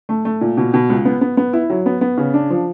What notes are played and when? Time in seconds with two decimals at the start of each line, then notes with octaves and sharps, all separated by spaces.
0.09 A3
0.25 A3
0.41 A#2
0.57 B2
0.74 B2
0.90 C#2
1.05 B3
1.21 B3
1.37 B3
1.53 E4
1.70 F#3
1.86 B3
2.01 B3
2.18 C#3
2.34 D4
2.50 F3